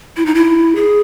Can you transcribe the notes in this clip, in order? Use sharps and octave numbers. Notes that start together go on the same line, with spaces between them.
E4
D#4
E4
G#4